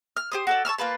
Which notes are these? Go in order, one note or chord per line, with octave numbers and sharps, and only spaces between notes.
F6
G4 C5 D#6
F#4 A4 D5
A5 C#6 E6 F6
A#3 F4 B4 A5